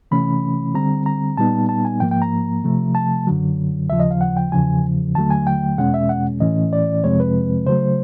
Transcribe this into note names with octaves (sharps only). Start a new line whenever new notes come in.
C3 E3 A3 C#4 B5
D3 G3 C4 A#5
A#5
A#2 G3 B3 D#4 A5
A5
G#5
G#2 F3 A#3 G5
G5
A#5
C3 F3 A3
A5
F#2 D3 F#3
D#2 C#3 F3 E5
D#5
F5
F#5
G5
E2 C#3 F3 G#5
D#2 D3 F#3 A3 A5
G#5
G5
E2 B2 G#3 C#4 F#5
E5
F#5
A2 E3 A3 C#4 D#5
D5
F2 C3 F3 G#3 C4 C#5
B4
C#3 F#3 A3 C5